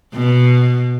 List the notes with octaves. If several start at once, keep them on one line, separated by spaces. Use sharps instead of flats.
B2